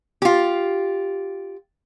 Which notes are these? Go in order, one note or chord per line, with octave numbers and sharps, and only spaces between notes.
F4 G4